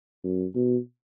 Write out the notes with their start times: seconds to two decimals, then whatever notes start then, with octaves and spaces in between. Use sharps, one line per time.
0.24 F#2
0.55 B2